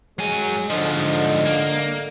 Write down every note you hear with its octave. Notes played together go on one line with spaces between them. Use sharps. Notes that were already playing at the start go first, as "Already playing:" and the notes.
F#3 G#3 G#5
G#2 D3 F3 D#5
A#3